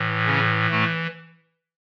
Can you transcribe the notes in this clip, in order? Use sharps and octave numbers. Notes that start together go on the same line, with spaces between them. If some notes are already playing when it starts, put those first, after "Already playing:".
Already playing: A2 E3
C#3 C#4
A2 A3